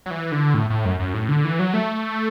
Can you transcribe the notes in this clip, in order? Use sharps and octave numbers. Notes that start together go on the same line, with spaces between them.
F#3
E3
D3
A2
A2
F#2
F#2
A2
D3
E3
F#3
A3